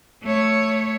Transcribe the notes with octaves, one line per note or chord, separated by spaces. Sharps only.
A3 C#5